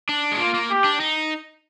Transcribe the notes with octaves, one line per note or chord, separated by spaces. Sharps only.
D4
G#3
A#3 F4
A#3
G4
D4
D#4